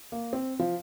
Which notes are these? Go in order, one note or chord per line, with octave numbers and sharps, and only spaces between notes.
A#3
C4
F3